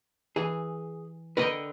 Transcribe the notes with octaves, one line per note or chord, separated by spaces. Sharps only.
E3 G#4
D3 A#4 B4 D#5 G5